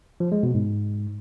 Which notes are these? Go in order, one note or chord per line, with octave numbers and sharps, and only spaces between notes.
F3
G#3
B2
G#2